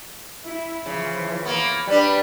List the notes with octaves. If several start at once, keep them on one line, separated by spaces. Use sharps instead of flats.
E4
C#3 E3 F3
A#3 B3
G3 D4 B4